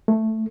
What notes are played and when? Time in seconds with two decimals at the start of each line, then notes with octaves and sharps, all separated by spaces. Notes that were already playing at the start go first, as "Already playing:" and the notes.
0.08 A3